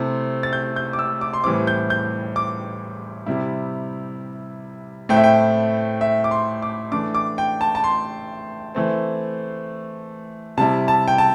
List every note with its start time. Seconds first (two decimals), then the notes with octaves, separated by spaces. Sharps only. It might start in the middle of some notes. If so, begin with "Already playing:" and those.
Already playing: C3 A3 C4 E4
0.43 A6
0.53 G6
0.76 G6
0.93 D6
0.99 E6
1.21 D6
1.34 C6
1.44 A2 E3 G3 C4 D6
1.67 G6
1.90 G6
2.36 D6
3.26 C3 G3 E4
5.09 A2 A3 C4 E4 G5
5.17 E5
5.24 G5
6.01 E5
6.24 D6
6.31 C6
6.62 D6
6.92 E3 A3 D4 D6
7.15 D6
7.38 G5
7.61 A5
7.75 A5
7.84 C6
8.75 E3 A3 C4
10.57 C3 G3 E4 A5
10.88 A5
11.08 G5
11.18 A5